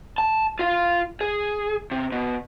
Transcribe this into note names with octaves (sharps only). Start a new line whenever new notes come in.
A5
F4 F5
G#4
C3
B2